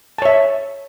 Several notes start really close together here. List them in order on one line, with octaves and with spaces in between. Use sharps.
A5 C#5 E5